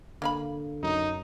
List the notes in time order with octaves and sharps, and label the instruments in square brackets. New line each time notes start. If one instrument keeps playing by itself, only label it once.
[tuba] D3 [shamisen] A#3 F5 B5
[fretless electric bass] F#2 [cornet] D#4